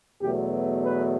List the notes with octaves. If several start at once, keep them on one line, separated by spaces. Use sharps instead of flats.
E2 B2 F#3 A3 G4
B4